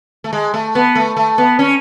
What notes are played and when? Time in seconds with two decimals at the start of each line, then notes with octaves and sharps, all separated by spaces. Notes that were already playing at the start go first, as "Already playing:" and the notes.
0.24 A3
0.33 G#3
0.54 A3
0.75 B3
0.95 A3
1.17 A3
1.38 B3
1.59 C#4